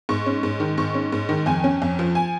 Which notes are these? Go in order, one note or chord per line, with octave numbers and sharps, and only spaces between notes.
G#2 C#6
C#4
G#2
D#3
G#2 C#6
C#4
G#2
D#3
F2 G#5
C#4
F2
F3
G#5